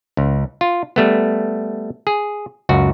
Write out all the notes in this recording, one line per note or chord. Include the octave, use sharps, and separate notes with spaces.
C#2
F4
G3 A3 B3
G#4
C#2 F#2 F#4